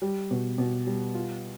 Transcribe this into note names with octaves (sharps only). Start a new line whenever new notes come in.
G3
B2
B2
G3
F4